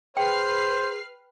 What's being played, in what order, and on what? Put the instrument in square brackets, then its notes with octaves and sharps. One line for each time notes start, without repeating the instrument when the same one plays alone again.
[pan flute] G#4 [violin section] B4 F6 C7 [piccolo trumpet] C5 [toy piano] G5